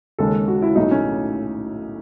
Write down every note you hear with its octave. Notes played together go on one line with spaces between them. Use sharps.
D#2 C#3 G#3 A4
F#4
E4
B1 A2 F#3 A3 D#4
C#4